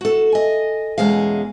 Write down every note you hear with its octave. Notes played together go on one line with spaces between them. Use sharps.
F#4 A4
D#5 G#5
E2 B2 G#3 C#4 G#4 F5